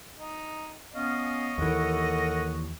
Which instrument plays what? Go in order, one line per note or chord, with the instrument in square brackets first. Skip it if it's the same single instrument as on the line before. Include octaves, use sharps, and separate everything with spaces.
[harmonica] D#4
[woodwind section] B3 C#4 F5 [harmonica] C#5 D#5
[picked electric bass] D#2 E3 [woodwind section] A4 A#4 F#5